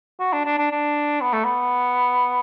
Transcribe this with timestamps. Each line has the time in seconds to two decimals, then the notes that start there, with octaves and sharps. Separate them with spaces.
0.20 F#4
0.33 D4
0.45 D4
0.58 D4
0.71 D4
1.21 B3
1.33 A3
1.44 B3